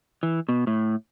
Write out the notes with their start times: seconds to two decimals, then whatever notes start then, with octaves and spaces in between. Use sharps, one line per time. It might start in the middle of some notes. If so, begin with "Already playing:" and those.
0.23 E3
0.49 B2
0.67 A2